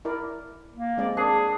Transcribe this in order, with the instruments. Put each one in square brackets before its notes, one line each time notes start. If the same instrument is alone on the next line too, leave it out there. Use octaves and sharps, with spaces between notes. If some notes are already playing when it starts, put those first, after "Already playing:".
[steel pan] E4 A#4 D5
[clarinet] A#3
[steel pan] G#3 C4 D5
[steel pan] A#3 [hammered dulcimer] D4 [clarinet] G#4